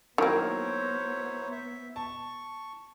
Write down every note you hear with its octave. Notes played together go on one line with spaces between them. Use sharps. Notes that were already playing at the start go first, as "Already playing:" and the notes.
D#3 F#3 A#3 B3 E4 A#4 C5 C#5
E5
A5 C#6